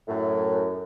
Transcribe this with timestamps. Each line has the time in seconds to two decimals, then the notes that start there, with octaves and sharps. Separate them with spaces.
0.08 F#2 A2